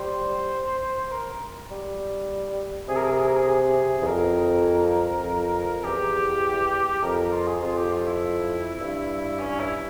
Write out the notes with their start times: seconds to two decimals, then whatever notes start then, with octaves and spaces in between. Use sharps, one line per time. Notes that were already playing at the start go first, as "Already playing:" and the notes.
Already playing: G3 C5
1.11 A#4
1.71 G3
2.89 C3 G#4
2.96 A#4
3.04 G#4
3.12 A#4
3.20 G#4
3.27 A#4
3.35 G#4
3.48 G#4
4.02 E2
4.07 F2 A#4
5.25 F2
5.84 E2 G4
7.03 F2 A#4
7.17 A#4
7.32 F4
7.47 G#4
7.62 F2 F4
7.77 G4
7.92 F4
8.06 E4
8.81 G2
9.40 C#4
9.60 E4